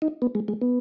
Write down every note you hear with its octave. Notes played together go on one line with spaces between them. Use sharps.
D#4
B3
G#3
G#3
B3